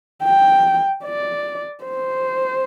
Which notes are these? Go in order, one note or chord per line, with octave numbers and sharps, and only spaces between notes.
G5
D5
C5